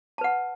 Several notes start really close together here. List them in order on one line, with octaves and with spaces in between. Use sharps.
A5 B4 F#5